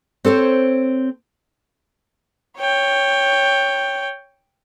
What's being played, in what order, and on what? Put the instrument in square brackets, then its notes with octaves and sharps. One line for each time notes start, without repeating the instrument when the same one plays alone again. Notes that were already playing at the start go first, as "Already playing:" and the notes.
[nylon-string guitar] C4 A4 C5 C#5
[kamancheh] C#5 G5